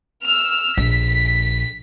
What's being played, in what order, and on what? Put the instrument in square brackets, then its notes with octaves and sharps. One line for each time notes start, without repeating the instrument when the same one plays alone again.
[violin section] E6 F6
[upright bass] A#1 [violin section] B6